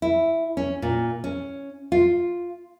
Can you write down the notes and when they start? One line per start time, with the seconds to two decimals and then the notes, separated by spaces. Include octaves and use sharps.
0.02 E4
0.57 C#4
0.82 A#2
1.24 C#4
1.92 F4